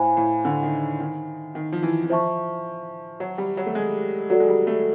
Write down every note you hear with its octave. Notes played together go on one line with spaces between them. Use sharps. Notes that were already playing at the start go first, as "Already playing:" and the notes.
Already playing: A2 C5 F5 G#5 B5
A2
D3
D#3
D#3
D#3
F3
E3
E3
F3 C5 E5 A5 C#6
F#3
G3
F#3
A3
G#3
F#3 F#4 A4 D5
G#3
G3
A3